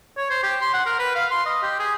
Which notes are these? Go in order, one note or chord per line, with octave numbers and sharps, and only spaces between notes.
C#5
C5
G4
C6
F#5
A#4
B4
F5
C6
D#5
G4
G#4